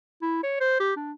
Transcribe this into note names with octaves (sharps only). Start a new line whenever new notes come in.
E4
C#5
C5
G4
D4